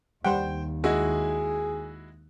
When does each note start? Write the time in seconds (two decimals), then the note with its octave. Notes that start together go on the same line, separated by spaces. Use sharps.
0.25 D#2 G3 C5 F#5 G5
0.84 G#3 E4 F#4 G#4